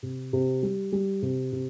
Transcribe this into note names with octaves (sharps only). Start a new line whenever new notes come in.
C3
C3
G3
G3
C3
C3